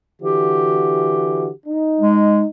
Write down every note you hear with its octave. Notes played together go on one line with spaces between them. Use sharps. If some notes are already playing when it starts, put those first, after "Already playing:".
D3 E3 F#4 G4
D#4
G#3